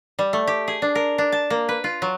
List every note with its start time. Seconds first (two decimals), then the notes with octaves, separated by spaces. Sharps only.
0.19 G3
0.33 A3
0.47 G4
0.68 G#4
0.82 D4
0.95 A#4
1.18 D4
1.32 A5
1.50 A#3
1.69 B4
1.84 F4
2.02 F#3